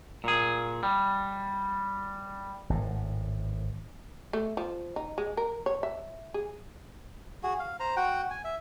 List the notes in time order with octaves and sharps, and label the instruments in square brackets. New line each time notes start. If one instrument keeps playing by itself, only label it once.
[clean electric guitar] A#2 G#4
G3
[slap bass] G#1 A2
[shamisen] A3
F3
D#4
G#3
A#4
C#5
E5
G#4
[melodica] F#4 G#4
F5
C5 A#5
F#4 F#5 G5
G#5
E5